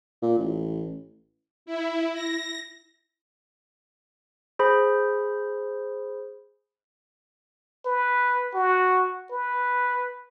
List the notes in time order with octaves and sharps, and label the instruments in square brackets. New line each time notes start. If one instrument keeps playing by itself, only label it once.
[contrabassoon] A#2
A1
[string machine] E4
A#6
[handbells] G#4 C5 B5
[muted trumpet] B4
F#4
B4